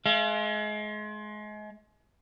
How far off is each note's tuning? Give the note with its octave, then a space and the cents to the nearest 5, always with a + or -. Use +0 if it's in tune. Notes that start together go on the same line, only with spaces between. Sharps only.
G#3 +30 F5 -35